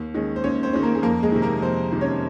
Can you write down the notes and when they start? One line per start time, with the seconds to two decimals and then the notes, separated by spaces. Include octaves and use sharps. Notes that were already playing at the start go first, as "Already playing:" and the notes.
Already playing: D#2
0.15 D#3 G#3 C#4
0.36 C5
0.44 D#2 C#4 C#5
0.63 C4 C5
0.73 D#3 G#3 C#4
0.83 A#3 A#4
0.95 G#4
1.02 F2 A#3 A#4
1.23 G#3 G#4
1.32 C3 D#3
1.42 A#3 A#4
1.62 F2 C4 C5
1.92 C3 D#3
2.01 C#4 C#5